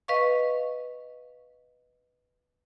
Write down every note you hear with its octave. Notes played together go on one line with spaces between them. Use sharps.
B4 D#5 F5 C#6